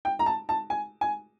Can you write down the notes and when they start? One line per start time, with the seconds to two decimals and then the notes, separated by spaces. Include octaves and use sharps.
0.05 G5
0.19 A#5
0.26 A5
0.49 A5
0.70 G#5
1.01 G#5